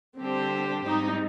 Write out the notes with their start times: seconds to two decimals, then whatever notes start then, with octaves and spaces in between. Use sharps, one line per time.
0.19 D3 G3 C4 D4 G4 C5
0.86 G#2 G3 C4 D#4